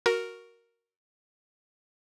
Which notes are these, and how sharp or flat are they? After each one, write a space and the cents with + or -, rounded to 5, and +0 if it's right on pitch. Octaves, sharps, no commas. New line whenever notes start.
F#4 +0 A#4 +0